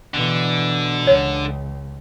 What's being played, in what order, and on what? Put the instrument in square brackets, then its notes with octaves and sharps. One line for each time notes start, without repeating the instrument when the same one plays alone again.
[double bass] B2 E3 [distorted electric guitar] D3
[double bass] C#2 [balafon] C#5